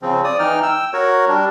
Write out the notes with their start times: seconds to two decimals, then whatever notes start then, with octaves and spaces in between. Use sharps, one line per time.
0.02 C#3 F3 C4
0.24 D5 D#6
0.39 E3 D#4 G5 F6
0.63 G5 E6
0.93 F#4 A#4 C#5
1.28 G3 D4